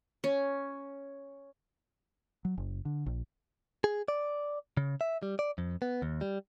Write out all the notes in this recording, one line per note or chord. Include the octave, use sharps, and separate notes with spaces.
C#4
F#3
F#1
D3
A#1
G#4
D5
C#3
E5
G3
D5
F2
B3
D#2
G3